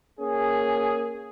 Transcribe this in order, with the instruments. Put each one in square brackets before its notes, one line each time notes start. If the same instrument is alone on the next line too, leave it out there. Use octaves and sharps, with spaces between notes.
[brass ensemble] A#3 C#4 G#4